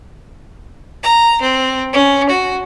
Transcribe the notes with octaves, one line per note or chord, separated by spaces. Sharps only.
A#5
C4
C#4
F#4